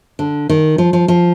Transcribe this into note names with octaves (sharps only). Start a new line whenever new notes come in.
D3
D#3
F3
F3
F3